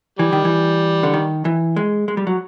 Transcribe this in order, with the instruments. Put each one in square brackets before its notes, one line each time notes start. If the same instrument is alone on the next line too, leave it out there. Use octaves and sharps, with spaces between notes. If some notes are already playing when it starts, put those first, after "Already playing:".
[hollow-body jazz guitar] E3 [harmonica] G3
[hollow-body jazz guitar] D#3
E3
D3
D#3
E3
G#3
G#3
G3
F#3